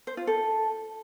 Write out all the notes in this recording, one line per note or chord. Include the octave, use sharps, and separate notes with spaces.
C5
F4
A4